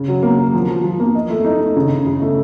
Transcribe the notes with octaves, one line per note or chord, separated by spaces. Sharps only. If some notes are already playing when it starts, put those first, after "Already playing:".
Already playing: C#3
F#3
A#3
F#3
F3
F3
F3
A#3
D#5
A3
D#4
D#4
C#3
C#3
C#3
A3